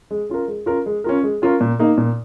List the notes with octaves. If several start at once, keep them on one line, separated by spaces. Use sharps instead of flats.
G#3
C#4 F4 A#4
G#3
C#4 F4 A#4
G#3
C#4 F4 A#4
G#3
C#4 F4 A#4
A#2
A#3 D#4
A#2